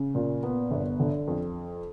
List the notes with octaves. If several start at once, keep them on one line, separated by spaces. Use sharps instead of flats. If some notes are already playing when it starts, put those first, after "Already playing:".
Already playing: C#3
A#2
B3
G1
D3
F2